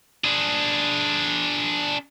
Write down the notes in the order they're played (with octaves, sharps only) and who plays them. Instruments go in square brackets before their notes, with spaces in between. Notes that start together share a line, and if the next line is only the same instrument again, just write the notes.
[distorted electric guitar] D4 G#4